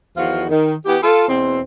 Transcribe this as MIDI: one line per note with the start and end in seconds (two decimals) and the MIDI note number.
0.17 0.45 40
0.17 0.45 51
0.17 0.45 53
0.17 0.45 65
0.17 0.45 66
0.50 0.75 51
0.86 0.97 52
0.86 0.97 59
0.86 0.97 67
1.02 1.26 65
1.02 1.26 69
1.28 1.61 40
1.28 1.61 47
1.28 1.61 60